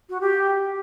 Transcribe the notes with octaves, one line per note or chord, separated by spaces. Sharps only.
F#4
G4